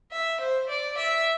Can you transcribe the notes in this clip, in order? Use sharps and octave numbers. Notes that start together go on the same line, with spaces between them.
E5
C5
D5
E5